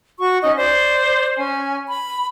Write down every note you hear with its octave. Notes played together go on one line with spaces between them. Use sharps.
F#4 C#6
C#4 D#4 D#5
C5 D5
C#4 G#5
B5